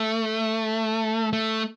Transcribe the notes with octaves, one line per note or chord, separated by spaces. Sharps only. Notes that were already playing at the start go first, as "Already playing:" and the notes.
Already playing: A3
A3